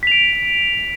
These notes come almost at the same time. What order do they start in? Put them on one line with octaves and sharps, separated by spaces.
B6 F7 D7